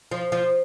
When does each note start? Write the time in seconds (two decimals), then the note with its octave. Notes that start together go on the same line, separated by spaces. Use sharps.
0.11 F3
0.32 F3